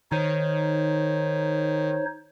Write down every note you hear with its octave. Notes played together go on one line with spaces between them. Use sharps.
D#3 D#4 C5 C#5